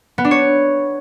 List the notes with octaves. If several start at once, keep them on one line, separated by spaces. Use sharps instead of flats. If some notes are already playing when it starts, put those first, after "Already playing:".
B3
D4
C#5